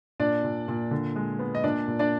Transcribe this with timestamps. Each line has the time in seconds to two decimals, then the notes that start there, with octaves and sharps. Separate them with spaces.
0.20 A#2 D4 D5
0.44 A#2
0.68 A#2
0.91 D3
1.16 G#3
1.39 B3
1.55 D#5
1.64 A#2 D4 D5
1.88 A#2
1.99 D4 D5